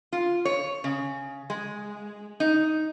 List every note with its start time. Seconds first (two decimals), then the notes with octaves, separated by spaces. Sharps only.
0.13 F4
0.45 C#5
0.84 C#3
1.50 G#3
2.40 D#4